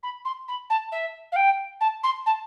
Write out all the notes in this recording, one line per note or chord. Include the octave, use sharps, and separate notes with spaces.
B5
C6
B5
A5
E5
F5
G5
A5
C6
A5